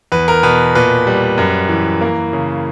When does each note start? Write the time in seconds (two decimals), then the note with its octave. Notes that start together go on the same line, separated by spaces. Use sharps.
0.12 E2 B4
0.28 A#4
0.43 B2 B4
0.75 A#2 B4
1.07 G3
1.38 F#2
1.69 E3
2.01 A#3
2.33 C#3